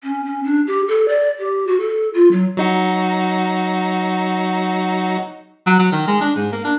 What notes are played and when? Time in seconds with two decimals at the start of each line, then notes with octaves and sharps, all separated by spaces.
0.03 C#4
0.25 C#4
0.44 D4
0.67 G4
0.88 A4
1.08 D5
1.39 G4
1.67 F#4
1.80 A4
2.14 F4
2.32 F#3
2.57 F#3 D#4 F#4
5.66 F#3
5.79 F#3
5.92 D#3
6.07 G#3
6.20 D4
6.36 G#2
6.52 A#3
6.64 D4